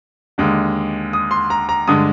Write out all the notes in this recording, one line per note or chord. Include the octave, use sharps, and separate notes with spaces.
D#2 D3 G#3
D#6
C6
A#5
A#5
G2 D3 G#3 D#6